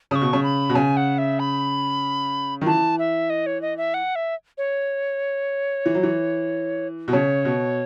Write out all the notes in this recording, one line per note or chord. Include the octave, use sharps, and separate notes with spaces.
C#3 C#6 D#6
B2
C#3
B5
B2
C#3 G#5
F#5
E5
B5
D#3
E3 A5
E5
D#5
C#5
D#5
E5
F#5
E5
C#5
E3
F#3
E3
B2
C#3 C#5
B2